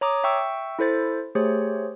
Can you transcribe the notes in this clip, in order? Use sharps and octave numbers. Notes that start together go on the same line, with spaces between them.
C#5 A#5 D6 D#6
E5 G5 C#6 E6
E4 A4 C5 A6
A3 G4 G#4 C5 C#5